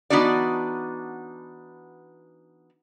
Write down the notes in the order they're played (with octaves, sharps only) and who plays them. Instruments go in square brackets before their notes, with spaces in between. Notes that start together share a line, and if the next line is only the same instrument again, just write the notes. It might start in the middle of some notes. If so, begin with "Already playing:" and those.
[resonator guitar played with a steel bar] E3 B3 D4 D#4 F#4 D5